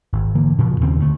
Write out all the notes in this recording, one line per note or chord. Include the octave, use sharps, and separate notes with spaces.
G#1
D3 E3 A#3
A#2 C#3 E3 F3
D#2 C#3 C4
D2 D3 A3